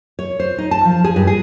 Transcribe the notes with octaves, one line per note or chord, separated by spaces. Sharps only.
C#5
C5
D#4
A5
F3
G#4
G2
G#4